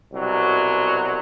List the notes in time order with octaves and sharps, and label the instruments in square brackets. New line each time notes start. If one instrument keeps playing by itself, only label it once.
[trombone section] C2 B2 F#3